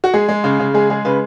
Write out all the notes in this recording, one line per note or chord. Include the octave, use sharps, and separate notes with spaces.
F#4
G#3 G#4
G#3
C#3
C#3
G#3 G#4
G#3 G#4
C#3 B4